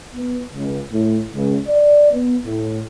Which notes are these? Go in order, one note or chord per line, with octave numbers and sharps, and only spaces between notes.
B3
C#2
A2
C#2
D5
B3
A2